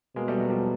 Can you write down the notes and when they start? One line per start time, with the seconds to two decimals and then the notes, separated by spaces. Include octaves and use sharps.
0.16 B2 G#3 A#3
0.28 G3 A3
0.38 F#3 G#3
0.50 F3 G3